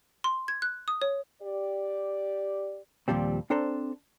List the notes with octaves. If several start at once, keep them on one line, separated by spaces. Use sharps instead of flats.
C6
G#6
F#6
D#6
C#5
G4 D5
D#2 A#2 F3 G3 C4
C4 D4 A4 C5 A5 A#5